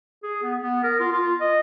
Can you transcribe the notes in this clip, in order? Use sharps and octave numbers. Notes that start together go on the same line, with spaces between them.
G#4
B3
B3
A#4
F4
F4
D#5